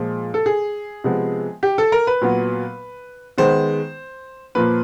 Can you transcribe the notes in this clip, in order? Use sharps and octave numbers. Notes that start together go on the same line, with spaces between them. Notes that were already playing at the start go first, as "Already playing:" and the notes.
Already playing: A#2 F3 G#3
A4
G#4
C3 F3 G#3 B3
G4
A4
A#4
B4
A#2 F#3 B3
D#3 G#3 B3 C5
A#2 F3 A#3 B4